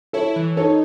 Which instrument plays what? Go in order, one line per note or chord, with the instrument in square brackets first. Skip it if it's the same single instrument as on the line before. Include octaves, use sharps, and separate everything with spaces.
[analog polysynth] E4 [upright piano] A4 C#5
[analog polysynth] E3
[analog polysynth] D#4 [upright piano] A4 C#5